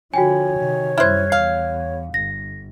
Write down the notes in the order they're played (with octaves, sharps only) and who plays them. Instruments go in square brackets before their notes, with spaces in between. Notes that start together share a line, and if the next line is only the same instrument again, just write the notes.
[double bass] D3 F3 [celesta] F#4 G5 G#5 [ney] C#5
[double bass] C3 D#3
[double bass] F#2 G3 [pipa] E4 C5 [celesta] F6 F#6 G#6
[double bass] E2 [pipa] F5
[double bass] G1 [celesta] A#6